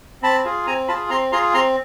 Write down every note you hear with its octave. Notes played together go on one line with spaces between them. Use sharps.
C4 A5 B5
F4 G#4
C4 G#5 A#5
F4 G#4 A5 B5
C4 A#5 C6
F4 G#4 A#5 C6
C4 A#5 C6